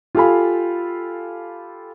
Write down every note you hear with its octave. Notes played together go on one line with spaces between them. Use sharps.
F4 G4 A4 F5 G#5 B5